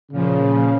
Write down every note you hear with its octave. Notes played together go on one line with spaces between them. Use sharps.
A#2 C#3 F3